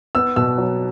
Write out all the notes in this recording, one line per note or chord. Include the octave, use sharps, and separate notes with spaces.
B3 E6
B2 E6
F#3